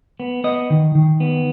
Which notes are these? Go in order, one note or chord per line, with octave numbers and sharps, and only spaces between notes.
B3
B3 D#5
D#3
D#3
B3